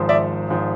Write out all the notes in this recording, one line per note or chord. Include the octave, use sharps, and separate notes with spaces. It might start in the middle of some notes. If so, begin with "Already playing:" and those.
Already playing: G#1 G#2 F3
D5 E5
G#1 G#2 F3